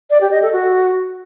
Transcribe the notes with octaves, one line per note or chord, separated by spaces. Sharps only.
D5
G4
D#5
A4
F#4